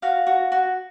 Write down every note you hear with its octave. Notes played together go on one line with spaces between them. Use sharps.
F#4 F5
F#4
F#4